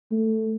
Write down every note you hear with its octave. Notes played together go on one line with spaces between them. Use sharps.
A3